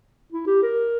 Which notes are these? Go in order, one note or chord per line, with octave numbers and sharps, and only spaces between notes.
E4
G4
A#4